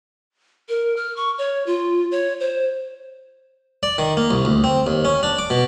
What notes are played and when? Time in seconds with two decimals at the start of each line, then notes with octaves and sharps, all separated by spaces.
0.69 A#4
0.97 F6
1.17 C#6
1.38 C#5
1.67 F4
2.11 C#5
2.40 C5
3.83 D5
3.98 D#3
4.17 A#3
4.31 C2
4.45 D2
4.64 C4
4.87 D#2
5.05 C#4
5.23 D4
5.39 D6
5.50 B2